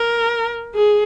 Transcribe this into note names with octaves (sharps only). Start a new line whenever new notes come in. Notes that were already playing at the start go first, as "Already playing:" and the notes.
Already playing: A#4
G#4